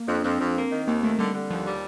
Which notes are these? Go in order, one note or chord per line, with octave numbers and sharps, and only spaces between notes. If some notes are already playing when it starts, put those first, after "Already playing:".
Already playing: A#3
F2 D4
F2 C4
F2
A#3
D#3
D#2 A#3
D#3 A3
D3 G3
D3
D#2 F3
G3